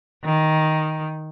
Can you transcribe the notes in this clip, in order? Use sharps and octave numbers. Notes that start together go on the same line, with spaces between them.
D#3